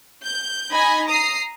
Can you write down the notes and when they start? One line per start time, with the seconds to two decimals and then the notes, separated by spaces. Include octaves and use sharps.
0.22 G6
0.72 D#4 D#5 G#5 B5 G#6
1.07 A#5 D#6 C7